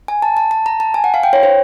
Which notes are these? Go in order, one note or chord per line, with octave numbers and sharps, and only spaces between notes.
G#5
A5
A5
A5
A#5
A5
G#5
F#5
F5
G5
C#5
C5